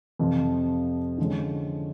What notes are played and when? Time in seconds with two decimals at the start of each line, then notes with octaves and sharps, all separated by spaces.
0.19 F2 C3 F3
1.18 D3 F3 G#3 C#4